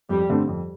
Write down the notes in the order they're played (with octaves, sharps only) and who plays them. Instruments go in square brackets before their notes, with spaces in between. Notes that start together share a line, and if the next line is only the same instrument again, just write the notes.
[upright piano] F2 [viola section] G3
[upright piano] D3 A3 C4
F2